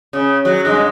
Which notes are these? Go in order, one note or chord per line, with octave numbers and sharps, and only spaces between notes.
C#3
F#3
G2 G#3